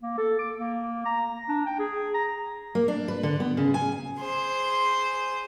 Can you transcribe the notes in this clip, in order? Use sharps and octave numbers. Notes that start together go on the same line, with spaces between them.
A#3
A4
D6
A#3
A#5
D4
G5
G#4
A#5
A#3
D4
B4
D3
B3
C#3
G#5
G#4 C5